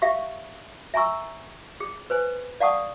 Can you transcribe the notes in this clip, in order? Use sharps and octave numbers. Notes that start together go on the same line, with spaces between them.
G4 E5 F5 C#6
E5 G#5 A#5 C#6 E6
G#4
B4 C5 G#5
D5 F5 F#5 A5 C#6 D#6